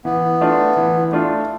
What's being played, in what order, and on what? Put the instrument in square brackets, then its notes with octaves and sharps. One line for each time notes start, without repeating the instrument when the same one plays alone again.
[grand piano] E3 [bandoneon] B3
[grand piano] A3 D4 F4
E3
A3 D4 F4